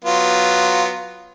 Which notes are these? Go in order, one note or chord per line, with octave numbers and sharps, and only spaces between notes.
F#3 B3 F4